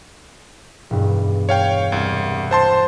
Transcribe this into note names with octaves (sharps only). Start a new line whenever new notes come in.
E1 G2
C#5 F5 G5
C2
C5 A5 C6